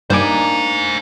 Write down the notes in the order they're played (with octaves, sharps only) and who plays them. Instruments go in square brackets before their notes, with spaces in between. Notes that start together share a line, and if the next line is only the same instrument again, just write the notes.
[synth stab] G2 G3 D6 [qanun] A#3 D4 D#4 [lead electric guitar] C5 G#5